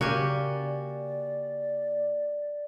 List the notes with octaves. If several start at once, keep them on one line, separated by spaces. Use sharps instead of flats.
C#3 A#3 F#4 G4 D5 G#5